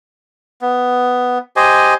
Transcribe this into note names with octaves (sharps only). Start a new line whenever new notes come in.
B3
G4 C5 D#5 G#5